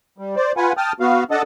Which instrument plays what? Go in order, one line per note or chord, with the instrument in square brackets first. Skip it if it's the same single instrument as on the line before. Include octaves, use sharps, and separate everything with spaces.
[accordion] G3
C5 D5
F4 B4 F#5 G#5
G5 A5 D#6 F6
B3 F#4 F5
D4 A4 D#5 F#5 A5